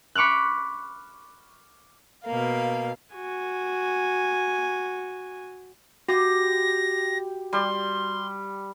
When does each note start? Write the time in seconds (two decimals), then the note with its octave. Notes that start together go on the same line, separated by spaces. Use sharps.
0.15 B5 C#6 D6 F6 F#6
2.25 B2 A#3 F5
3.14 F#4 G#5
6.08 F#4 G4 A#6
7.53 G3 C6